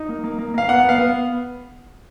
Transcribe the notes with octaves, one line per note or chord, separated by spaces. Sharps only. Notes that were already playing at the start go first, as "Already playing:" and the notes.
Already playing: D#4
A#3
A#3
A#3
A#3 F5
B3 F#5
B3 F5
B3